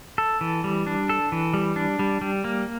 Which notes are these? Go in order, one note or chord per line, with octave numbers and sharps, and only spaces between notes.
A4
E3
G3
D4
A4
E3
G3
D4
G3
G3
A#3